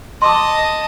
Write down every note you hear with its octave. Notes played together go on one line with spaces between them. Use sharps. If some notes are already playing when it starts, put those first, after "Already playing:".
D#5 A5 C6 D6 D#6